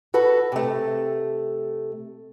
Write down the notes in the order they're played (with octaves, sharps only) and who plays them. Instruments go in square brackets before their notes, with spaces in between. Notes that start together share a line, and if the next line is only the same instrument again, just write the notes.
[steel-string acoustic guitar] F#4 A4 B4
C3 A3